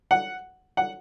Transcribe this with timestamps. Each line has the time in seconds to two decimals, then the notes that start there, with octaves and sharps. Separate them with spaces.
0.11 F#5
0.77 F#5